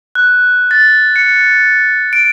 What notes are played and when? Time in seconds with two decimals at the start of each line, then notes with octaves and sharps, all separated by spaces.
0.15 F#6
0.71 A6
1.16 C#7
2.13 D7